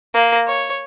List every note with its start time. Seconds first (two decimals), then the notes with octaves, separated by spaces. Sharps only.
0.14 A#3
0.47 C#5